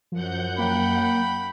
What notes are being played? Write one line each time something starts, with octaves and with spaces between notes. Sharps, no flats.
F#2 F3 F#5 G6
A#3 G5 B5